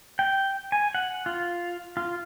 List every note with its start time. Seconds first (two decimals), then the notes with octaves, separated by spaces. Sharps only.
0.19 G5
0.72 G#5
0.95 F#5
1.26 F4
1.97 F4